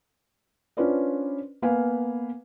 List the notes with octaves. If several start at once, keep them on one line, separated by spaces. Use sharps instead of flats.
C#4 D4 F4 B4 C5 D5
A#3 B3 B4 F5 G#5